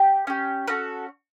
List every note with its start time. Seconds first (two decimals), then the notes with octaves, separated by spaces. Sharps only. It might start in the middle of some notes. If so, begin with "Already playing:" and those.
Already playing: G4
0.27 C#4 G4
0.67 C#4 F#4 A4 B4